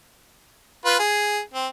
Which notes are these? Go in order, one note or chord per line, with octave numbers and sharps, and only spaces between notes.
F4 B4
G#4
C4